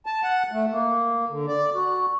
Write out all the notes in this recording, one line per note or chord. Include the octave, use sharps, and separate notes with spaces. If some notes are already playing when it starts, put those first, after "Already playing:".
A5
F#5
A3
A#3
D3
D5
F#4